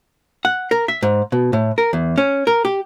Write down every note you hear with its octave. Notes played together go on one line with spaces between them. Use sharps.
F#5
A#4
E5
G#2
B2
A2
A#4
E2
C#4
A#4
G4